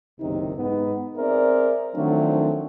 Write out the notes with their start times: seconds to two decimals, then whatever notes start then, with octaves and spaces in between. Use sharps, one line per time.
0.20 F#1 B1 C3 D#3 D#4
0.57 G#2 B3 D#4
1.18 C4 G#4 A#4 C5 D5 E5
1.96 D#3 F3 F#3 A3 C4 D4